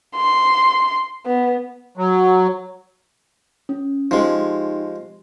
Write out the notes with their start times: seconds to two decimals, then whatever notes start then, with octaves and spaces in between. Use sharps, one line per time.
0.16 C6
1.26 B3
1.97 F#3
3.69 C#4
4.11 F3 G#3 D#4 G4